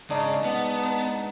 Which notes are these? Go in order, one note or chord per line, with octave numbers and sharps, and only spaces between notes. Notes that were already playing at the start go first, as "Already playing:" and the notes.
G#2 C#3 D4 D#4 D5
B3 F#5 A5